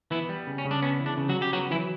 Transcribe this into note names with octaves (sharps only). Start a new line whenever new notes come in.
E3 B3 E4
G3
C#3
C#4
C#3
D4
B3 C#4
E3
D4
C#3
F#3 F#4
C#3
G4
F#3 B3 F#4
E3 F#3 E4